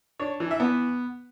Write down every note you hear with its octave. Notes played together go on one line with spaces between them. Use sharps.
D4 C#5
E3
E5
B3